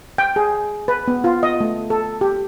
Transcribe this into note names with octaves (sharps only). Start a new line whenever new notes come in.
G5
G#4
B4
B3
F4
D#5
A3
A4
G4